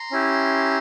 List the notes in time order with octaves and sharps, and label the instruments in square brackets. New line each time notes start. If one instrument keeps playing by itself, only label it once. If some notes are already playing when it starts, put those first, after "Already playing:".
Already playing: [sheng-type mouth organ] A#5 C6
C#4 E4 G4